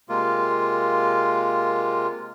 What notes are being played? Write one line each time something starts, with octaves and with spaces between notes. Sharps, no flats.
C3 G#3 A#3 F4